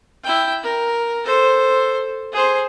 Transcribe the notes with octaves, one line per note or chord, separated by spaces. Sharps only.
E4 G5
A#4
A4 C5
G#4 C5